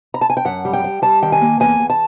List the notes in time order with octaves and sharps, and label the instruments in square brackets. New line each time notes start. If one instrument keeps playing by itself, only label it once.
[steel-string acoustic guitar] A#5
A5
G#5
G5
F#2 F#5
G3
G5
G3
G3 A5
D#3 G5
G#5
A#3
E2 G#5
E2
A5